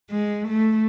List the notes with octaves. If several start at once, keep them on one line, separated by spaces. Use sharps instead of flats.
G#3
A3